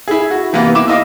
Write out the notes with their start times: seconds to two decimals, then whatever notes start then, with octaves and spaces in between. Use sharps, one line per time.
0.08 E4 G#4
0.31 F#4
0.53 C3 E3 A#3 B3
0.75 E4 D6 E7
0.88 E4 D#5 F5 D6